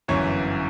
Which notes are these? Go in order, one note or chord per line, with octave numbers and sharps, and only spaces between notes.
G1 F#2 E3 C#5